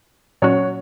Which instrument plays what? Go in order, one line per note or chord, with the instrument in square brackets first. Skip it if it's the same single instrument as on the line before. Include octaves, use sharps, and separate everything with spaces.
[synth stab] A#2 F#3 C#4 F#4 [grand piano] C#5